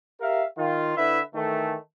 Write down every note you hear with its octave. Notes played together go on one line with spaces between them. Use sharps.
G4 A#4 E5 F5
D#3 F4
D3 E4 B4 E5
D#3 E3 A3